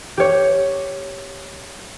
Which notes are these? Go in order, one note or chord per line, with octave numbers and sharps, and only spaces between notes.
G4 C#5